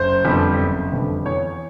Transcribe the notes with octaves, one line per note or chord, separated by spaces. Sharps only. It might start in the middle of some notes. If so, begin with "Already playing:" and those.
Already playing: F#1 C5
F2 D3 G3 B3
F#1
F2 D3 G3 B3
E2 C#5